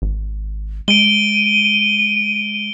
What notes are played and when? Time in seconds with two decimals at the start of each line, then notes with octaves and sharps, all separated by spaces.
0.02 G#1
0.88 G#3 D7 D#7 G7